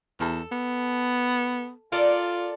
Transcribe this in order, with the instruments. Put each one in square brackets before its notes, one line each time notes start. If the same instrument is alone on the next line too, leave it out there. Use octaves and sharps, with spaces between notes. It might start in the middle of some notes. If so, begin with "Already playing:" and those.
[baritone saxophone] E2 [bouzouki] A4
[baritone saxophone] B3
[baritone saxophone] F4 [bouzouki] A4 A#4 D5